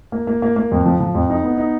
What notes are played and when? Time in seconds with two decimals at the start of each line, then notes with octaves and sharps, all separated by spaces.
0.12 A#3
0.27 A#3
0.42 A#3
0.56 A#3
0.72 F2
0.86 F3
1.00 F3
1.15 F2
1.30 D#4
1.44 B3
1.58 D#4